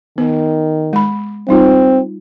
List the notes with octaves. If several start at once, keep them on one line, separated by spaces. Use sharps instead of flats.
D#3 B3
G#3 B5
G3 C4 D#4 F4